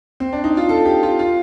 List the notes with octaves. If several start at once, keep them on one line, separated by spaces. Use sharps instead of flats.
C4
D4
D#4
F4
A4
G4
F4
F4